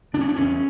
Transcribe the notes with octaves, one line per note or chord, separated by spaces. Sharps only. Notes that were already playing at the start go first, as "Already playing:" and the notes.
C#3 D4
C#4
D4
E2 C#4